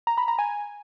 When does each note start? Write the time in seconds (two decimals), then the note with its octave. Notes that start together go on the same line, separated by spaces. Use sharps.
0.07 A#5
0.18 B5
0.28 A#5
0.39 G#5